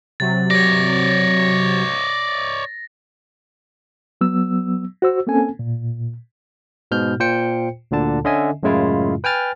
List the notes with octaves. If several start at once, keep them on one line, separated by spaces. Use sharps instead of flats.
C3 F#3 A6
C#5 D5 A#6
F#3 B3 E6
F#4 C5 E6
A#3 C4 C#4 A4 G#5
A#2
G#2 B2 F6 G6
A#2 F4 C5 G5 C#7
D2 A#2 D3 A5
D3 C#4 D#5 E5 G#5
F#2 A2 C#3 G#3 E4 F4
B4 G5 G#5 F6 A6